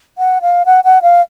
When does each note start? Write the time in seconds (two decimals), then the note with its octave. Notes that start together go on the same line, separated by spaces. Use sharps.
0.18 F#5
0.42 F5
0.66 F#5
0.84 F#5
1.02 F5